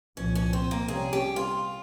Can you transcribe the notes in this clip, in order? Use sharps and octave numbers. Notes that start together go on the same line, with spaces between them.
C2 A#2 F3 C#4
C#4
C4
A#3
C3 G3 C#4 G#4
G4
F4